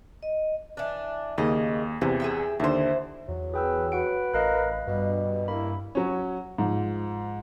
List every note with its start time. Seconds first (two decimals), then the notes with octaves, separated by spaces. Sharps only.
0.23 D#5
0.77 E3 D4
1.38 D#2 C#3 A#3 D#5
2.01 E2 C3 E3
2.20 G#4 E5 G5
2.60 D#2 D3 E4 C5
3.28 E2 F#3
3.54 G#4 B4 G5 E6
3.92 F#4 B4 F#5 D7
4.34 A1 A#4 D#5 F5 F#6
4.87 G2 B2 G3
5.48 A#3 E4 B5
5.95 F#3 C#4
6.58 G#2 F3